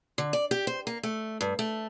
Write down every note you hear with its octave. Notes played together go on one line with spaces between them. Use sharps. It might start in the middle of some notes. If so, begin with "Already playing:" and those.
D3
D5
G4
C5
A#3
A3
G2
A3